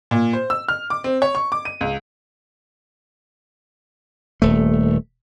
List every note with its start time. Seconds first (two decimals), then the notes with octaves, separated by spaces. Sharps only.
0.11 A#2
0.33 C5
0.50 E6
0.68 F6
0.90 D6
1.04 C4
1.22 C#5
1.35 C#6
1.52 D6
1.65 D#7
1.81 C#2
4.42 D#1 A3